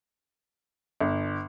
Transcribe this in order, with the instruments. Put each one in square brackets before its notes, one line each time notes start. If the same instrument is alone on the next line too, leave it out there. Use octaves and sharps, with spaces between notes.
[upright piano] G1